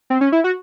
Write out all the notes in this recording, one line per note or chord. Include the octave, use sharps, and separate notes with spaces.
C4
C#4
E4
F#4